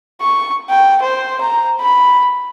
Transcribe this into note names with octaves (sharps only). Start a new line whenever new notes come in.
C#6
G5
C5
A#5
B5